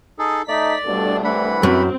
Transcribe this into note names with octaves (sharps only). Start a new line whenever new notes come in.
D#4 G#4 A4
A3 D#4 D5 B6
C2 G2 B2 G3 A3 D4
C2 E3 B4 F#5 B5
F#2 C4